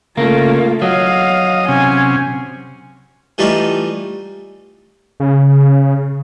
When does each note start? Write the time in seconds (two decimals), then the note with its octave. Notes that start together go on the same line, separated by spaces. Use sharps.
0.17 C#3 A3 A#3 F4
0.82 F#3 D#5 F5
1.69 C3 C#4 G#5
3.38 E3 G3 A3 D#4 F4
5.20 C#3